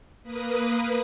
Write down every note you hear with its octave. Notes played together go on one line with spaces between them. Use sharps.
A#3 B4 D#6